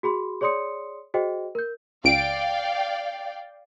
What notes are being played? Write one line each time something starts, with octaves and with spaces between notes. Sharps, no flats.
F#4 G#4 B5 C6
G#4 C#5 D5 C6 D#6 C#7
F#4 G#4 C5 D#5 G5
A#4 G6
C#2 D5 F5 G5 D7